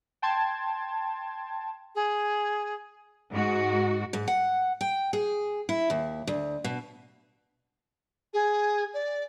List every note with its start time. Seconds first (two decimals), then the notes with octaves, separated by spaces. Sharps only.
0.22 G5 A5 C6 G#6
1.95 G#4
3.31 G#2 F#4
4.13 G#2
4.28 F#5
4.81 G5
5.13 G#4
5.69 E4
5.90 D#2
6.27 D2
6.64 B2
8.34 G#4
8.94 D5